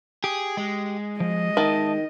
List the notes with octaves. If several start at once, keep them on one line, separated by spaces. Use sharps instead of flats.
G4 G#4
G#3
F3 D#5
D#3 E5 A5